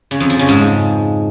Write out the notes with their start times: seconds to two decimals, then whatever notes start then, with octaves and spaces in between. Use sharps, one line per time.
0.11 C#3
0.20 F2
0.30 F3
0.39 C#3
0.49 G#2